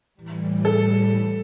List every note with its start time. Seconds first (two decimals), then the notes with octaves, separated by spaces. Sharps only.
0.15 A2 E3 G3
0.65 A4